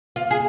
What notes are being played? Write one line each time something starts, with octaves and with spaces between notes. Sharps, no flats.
F4
G#4